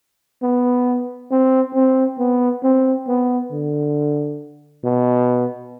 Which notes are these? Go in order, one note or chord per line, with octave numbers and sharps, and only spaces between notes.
B3
C4
C4
B3
C4
B3
D3
B2